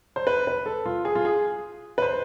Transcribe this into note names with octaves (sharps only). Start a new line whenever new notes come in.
C5
B4
B4
A4
F4
G#4
F4
G#4
B4
C5